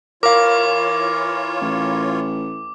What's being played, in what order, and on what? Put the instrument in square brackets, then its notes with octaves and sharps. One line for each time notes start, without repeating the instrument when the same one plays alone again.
[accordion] E3 F4 C#5 [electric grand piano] A#4 F5 [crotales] D6
[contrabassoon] A1